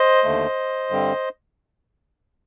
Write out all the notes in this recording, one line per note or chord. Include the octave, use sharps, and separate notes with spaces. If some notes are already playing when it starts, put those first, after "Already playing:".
Already playing: C5 D#5
D#2 D3 A3
G2 D3 G3 C4